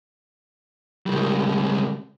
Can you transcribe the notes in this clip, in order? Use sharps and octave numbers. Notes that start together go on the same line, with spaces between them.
C#2 G3